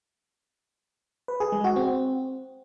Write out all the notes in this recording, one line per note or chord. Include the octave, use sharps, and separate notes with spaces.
B4
G#4
G#3
F#4
C4